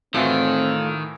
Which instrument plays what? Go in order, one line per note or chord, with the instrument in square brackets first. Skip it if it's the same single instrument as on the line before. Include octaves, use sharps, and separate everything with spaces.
[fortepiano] A2 E3 F#4 [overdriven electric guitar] D#3 [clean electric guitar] A3 F4 [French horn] C4